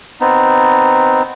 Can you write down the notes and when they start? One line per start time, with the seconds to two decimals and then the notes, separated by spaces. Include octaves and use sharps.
0.21 B3 C4 D#4